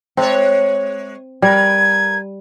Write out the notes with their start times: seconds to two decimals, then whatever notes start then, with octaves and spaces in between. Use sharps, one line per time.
0.17 G#3 C4 C#5
1.42 G3 A#4 B4 G#6